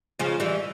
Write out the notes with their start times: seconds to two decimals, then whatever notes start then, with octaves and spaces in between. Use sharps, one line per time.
0.19 C#3 F3
0.40 E3 G3